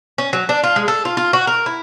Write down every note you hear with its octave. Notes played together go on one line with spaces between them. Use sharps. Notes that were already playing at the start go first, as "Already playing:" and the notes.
C#4
F#3
D4
F4
G#3
A4
F4
F4
F#4
A#4
E4